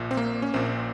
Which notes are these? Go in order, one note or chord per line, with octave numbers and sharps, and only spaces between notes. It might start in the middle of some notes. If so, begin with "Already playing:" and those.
Already playing: A#1 A#2
C4
A#3
C#4
A#1 A#2 C4